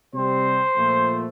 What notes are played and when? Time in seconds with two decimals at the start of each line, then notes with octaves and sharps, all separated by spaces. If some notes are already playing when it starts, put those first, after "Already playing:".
0.13 C3 G3 C4 C5
0.76 A#2 F3 A3